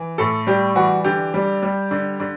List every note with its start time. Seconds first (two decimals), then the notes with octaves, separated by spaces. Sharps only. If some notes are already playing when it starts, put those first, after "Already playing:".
Already playing: E3
0.18 A2 A4
0.47 G3 G4
0.76 E3 F#4
1.04 D3 G4
1.34 G3
1.63 G3
1.91 D3
2.20 D3